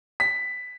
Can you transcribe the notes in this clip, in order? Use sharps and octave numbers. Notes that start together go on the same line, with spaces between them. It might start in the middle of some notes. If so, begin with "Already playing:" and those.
B6